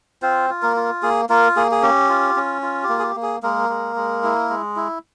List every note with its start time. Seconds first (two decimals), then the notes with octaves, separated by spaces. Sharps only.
0.22 C4 F4 C5
0.50 F4
0.62 A#3 A#4
0.76 F4
1.03 A#3 G#4
1.29 A#3 F4 A#4
1.56 A#3 G#4
1.71 G#4
1.82 C#4 G4
2.09 F4
2.36 C#4
2.62 F4
2.83 G4
2.89 A#3
2.99 G#4
3.02 G4
3.16 A#3
3.22 G#4
3.43 G#3 A#3 A#4
3.69 G#3
3.96 G#3
4.24 E4
4.50 G#3
4.76 E4